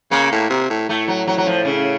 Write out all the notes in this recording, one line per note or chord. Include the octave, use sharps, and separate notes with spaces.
C#3 A#3
A2
C3
A2
A2 A3
F#3
F#3
F#3
F3
C#3